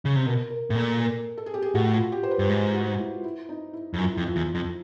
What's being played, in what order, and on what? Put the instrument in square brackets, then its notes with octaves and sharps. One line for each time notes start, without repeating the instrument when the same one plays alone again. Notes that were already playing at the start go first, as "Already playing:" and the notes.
[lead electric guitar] C#3
C3
[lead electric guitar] B2 [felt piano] A#4
[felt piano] A#4
[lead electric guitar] A2
[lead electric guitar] A#2 [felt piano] A4
[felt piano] A#4
A4
G#4
G4
G#4
[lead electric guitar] A2 [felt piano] F#4
[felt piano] F4
G4
C5
B4
[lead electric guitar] G2
G#2
[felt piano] F#4
E4
F4
E4
D#4
E4
[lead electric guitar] F2
[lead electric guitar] F#2 [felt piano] F4
[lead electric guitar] F2 [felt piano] E4
[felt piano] F4
[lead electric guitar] E2
F2